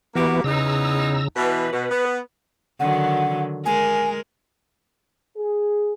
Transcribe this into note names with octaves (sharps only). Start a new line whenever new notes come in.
E3 A#3 B3 F#4 G4
E2 C#3 D#4 A#5 E6
B2 E3 B4
B2
B3
D3 D#3 F#3 F#5
G#3 A#4 G#5
G#4